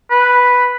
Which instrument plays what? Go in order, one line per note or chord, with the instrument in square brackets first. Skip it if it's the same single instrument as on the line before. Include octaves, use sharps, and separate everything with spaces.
[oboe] B4